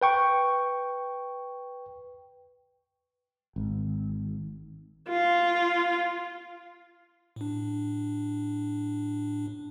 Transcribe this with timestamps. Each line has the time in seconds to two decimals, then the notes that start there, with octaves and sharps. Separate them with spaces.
0.01 B4 G5 C#6
3.56 G#1
5.09 F4
7.36 A2 D4